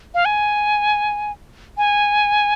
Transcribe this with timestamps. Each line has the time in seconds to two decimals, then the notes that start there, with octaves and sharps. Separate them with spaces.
0.14 F5
0.25 G#5
1.77 G#5